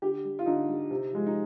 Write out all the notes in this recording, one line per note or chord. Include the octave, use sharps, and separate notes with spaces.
D3 G4
G3
F4
D3 D#4
G3
C3
F3 G#3
D#4